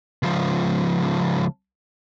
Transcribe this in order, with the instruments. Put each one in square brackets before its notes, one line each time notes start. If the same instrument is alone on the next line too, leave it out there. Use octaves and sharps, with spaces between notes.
[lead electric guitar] C#2 F3